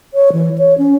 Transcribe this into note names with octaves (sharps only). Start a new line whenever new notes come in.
C#5
E3
C#5
C#4